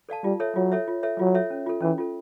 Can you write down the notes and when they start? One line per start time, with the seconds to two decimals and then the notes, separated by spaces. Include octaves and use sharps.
0.09 A4 D5 F5 A5
0.24 G3 F4
0.40 A4 C#5 E5
0.56 F#3 F4
0.72 A4 C#5 E5
0.88 F4
1.03 A4 C#5 E5
1.19 F#3 F4
1.35 A4 C#5 E5
1.50 C#4
1.66 F4 A4
1.82 E3 C#4
1.98 F4 A4